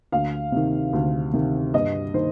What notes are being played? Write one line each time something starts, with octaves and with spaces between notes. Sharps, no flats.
D2 F5
C3 D#3
D2
C3 D#3
G2 D#5
D#3 C5